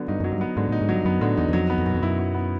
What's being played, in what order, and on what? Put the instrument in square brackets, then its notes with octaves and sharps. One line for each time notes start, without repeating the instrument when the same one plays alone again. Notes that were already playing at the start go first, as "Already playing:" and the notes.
Already playing: [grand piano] D3 F#3 B3
[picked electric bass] G2 [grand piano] D#4
[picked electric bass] F#2 [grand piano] F#3
[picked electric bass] G2
[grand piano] B3
[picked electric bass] G#2 [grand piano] D3
[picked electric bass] A2 [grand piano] D#4
[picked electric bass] G#2
[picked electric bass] G2 [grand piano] F#3
[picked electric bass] F#2 [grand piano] B3
[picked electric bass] A2 [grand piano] D3
[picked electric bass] E2 [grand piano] D#4
[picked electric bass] E2
[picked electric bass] F2 [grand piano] F#3
[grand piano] B3
[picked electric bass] F2
[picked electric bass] F#2 [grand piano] B2
[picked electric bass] F2
[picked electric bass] F#2 [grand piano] E4
[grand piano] F#3
B3